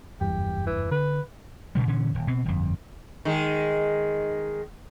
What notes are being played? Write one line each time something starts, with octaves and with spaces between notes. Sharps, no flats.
F#1 E2 G2 G4
E3
D3 B4
G2 A#2 C#3 G3
A#2 D3 E3 C#4
D#1
B2 C4
G1 F2
D#3 G#3